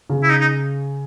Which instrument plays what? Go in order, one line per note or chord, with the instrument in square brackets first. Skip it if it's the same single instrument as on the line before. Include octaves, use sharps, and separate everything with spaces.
[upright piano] C#3
[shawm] E4
D#4
D#4